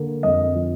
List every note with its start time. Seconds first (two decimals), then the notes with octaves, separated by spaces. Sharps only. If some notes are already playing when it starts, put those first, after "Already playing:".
Already playing: D3 A#3
0.23 F2 D#5
0.55 F3